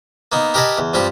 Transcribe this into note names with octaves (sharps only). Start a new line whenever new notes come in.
A#3 B3 D#4
G4 A#4 B4 D#5 G#5 A5
E2
G2 F3 G3 C4 G4